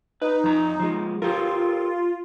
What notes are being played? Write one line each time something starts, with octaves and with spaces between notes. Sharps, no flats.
D#4 B4
F2 A#5
F3 G#3
F4 G4 A4 A#4